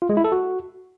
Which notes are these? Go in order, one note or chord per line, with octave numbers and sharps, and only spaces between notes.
F4
G#3
E4
A4
F#4